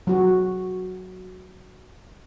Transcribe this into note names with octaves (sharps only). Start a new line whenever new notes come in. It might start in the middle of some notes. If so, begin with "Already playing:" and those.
F#3 F#4